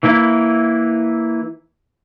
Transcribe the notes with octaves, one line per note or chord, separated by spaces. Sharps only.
E3 A#3 E4